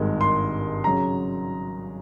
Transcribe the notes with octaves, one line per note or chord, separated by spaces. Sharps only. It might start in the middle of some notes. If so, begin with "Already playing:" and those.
Already playing: G#1 G2 D#3 G#3
C6
C#3 F#3 A#5